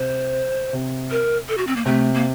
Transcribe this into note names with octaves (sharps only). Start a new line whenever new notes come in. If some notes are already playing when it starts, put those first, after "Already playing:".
Already playing: C3 C5
C3
A#4
A4
F#4
C4
A#3
C3 A3
A#3